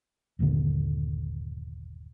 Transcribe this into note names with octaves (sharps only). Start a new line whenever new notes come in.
G1 D#2 A#2 D3